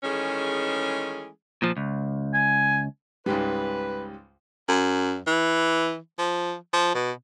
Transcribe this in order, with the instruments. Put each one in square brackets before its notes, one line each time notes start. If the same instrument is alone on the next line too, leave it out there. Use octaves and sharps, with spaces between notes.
[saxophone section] D#3 E3 G#3 A3 C#4 G#4
[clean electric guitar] A#2 F3
C#2
[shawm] G#5
[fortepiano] C#2 G#2 G3 [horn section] B4
[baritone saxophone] F#2
E3
F3
F3
B2